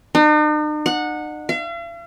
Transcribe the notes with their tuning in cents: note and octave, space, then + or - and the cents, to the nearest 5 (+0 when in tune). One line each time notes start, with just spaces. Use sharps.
D#4 -45
F#5 -15
F5 -45